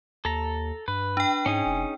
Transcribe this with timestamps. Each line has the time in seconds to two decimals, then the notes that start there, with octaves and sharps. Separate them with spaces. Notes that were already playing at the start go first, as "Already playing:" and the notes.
0.25 D#2 A4 A#5
0.88 G2 B4
1.17 D4 G5
1.46 G#2 C#4 D#4 G#4
1.66 F1